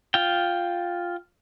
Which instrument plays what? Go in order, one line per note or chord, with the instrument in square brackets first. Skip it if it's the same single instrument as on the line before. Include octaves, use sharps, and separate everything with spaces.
[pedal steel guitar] F4 G5